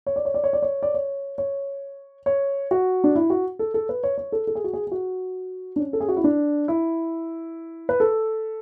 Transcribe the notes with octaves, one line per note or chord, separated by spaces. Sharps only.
C#5
D5
C#5
D5
C#5
D5
C#5
D5
C#5
C#5
C#5
F#4
D4
E4
F#4
A4
A4
B4
C#5
C#5
A4
A4
G#4
F#4
G#4
G#4
F#4
D4
C#4
A4
G#4
F#4
E4
D4
E4
B4
A4